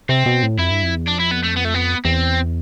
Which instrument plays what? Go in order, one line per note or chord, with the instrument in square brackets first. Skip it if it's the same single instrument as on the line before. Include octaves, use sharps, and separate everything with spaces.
[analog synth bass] C3 [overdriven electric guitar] C4
[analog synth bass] B2
A2
[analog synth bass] F2 [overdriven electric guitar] E4
[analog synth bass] G2
F2
E2
[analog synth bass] F2 [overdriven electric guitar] D4
[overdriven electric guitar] E4
B3
A3
B3
A3
B3
[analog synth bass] E2 [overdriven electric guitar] C4